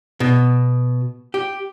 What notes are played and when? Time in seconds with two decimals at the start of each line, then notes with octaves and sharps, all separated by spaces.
0.20 B2
1.34 G4